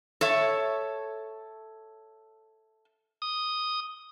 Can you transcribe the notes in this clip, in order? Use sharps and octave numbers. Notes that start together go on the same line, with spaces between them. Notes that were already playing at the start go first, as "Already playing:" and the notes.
A4 C#5 E5
D#6